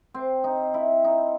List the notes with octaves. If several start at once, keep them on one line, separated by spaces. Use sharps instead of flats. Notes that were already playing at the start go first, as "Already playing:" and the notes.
C4
D#4
E4
D#4